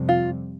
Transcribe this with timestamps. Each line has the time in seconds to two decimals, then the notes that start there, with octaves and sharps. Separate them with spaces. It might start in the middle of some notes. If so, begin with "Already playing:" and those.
Already playing: F2 C3 G3
0.09 F4